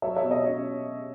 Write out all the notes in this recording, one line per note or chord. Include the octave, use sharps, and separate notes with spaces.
F#3 C#5 E5
C#5 E5
B2
D#5
C#4 C#5